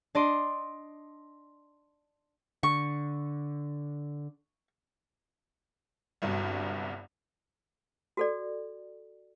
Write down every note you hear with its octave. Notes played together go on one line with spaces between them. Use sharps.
D4 D5 D#5 C6
D3 C#6
G1 C2 G2 F#3
F#4 A4 D5